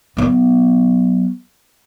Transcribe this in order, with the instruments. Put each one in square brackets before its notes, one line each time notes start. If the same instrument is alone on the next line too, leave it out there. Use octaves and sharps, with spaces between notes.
[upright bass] F#3 B3